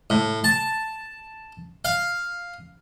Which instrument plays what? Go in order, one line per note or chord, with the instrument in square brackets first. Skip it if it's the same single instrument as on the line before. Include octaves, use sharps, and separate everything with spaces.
[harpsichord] A2
A5
F5